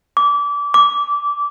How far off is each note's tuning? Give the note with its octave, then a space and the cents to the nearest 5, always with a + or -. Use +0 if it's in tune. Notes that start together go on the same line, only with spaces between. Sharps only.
D6 -25
D6 -15